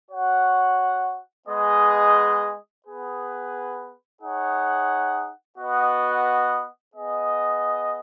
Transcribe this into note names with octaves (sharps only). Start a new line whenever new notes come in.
F#4 C#5 F#5
G#3 B3 G#4 D#5
B3 G#4 B4
D#4 G#4 C#5 F#5
B3 F#4 B4 D#5 F#5
B3 G#4 D#5